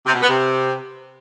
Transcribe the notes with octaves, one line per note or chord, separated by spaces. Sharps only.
C3
B2
B3
C3